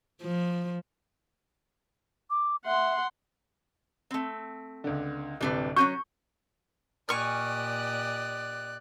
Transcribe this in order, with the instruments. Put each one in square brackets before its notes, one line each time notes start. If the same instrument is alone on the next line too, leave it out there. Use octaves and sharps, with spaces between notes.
[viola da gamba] F3
[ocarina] D6
[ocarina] E5 [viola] F#5 C6
[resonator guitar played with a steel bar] A3 C4
[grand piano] C#2 D3
[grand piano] D1 C3 [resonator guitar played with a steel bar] G3 D4 B4
[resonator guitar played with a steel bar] F#3 C#4 F#4 [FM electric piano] C#6 [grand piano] G6
[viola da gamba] A#2 G4 D#5 [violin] D5 F#6 [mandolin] G#5 C#6 F6